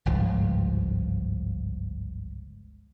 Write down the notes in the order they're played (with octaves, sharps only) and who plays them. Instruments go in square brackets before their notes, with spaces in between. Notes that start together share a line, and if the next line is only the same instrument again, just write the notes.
[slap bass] G1 C#2 G#2 F3